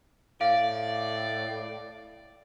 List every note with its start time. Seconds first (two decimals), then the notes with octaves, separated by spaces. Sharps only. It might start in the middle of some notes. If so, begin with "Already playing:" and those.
0.41 A2 D5 F5